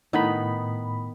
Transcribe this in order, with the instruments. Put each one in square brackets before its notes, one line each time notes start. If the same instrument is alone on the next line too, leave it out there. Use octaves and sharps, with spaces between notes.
[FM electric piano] A2 B5 [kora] D#3 B3 D#4